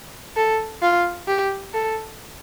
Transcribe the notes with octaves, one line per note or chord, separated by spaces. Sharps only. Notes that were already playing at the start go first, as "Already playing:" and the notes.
A4
F4
G4
A4